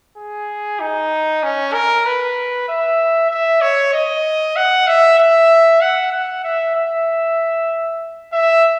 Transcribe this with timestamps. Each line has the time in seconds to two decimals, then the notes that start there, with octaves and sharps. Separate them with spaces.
0.17 G#4
0.80 D#4
1.43 C#4
1.73 A#4
2.06 B4
2.68 E5
3.30 E5
3.62 C#5
3.93 D#5
4.56 F#5
4.87 E5
5.18 E5
5.81 F#5
6.12 F#5
6.44 E5
6.75 E5
8.33 E5